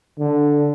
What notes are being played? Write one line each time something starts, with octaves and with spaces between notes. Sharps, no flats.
D3